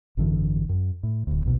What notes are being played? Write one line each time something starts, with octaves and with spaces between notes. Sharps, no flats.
G#1 F#2 D3 E3
F#2
A2
D1 D2
A#1 D#2 B2